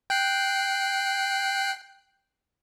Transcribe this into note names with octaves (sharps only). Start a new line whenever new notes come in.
G5 F#6 C7